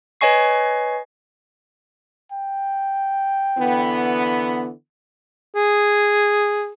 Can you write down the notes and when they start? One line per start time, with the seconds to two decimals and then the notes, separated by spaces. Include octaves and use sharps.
0.21 B4 C#5 D#5 G#5 C#6 C7
2.32 G5
3.58 D3 E3 B3
5.55 G#4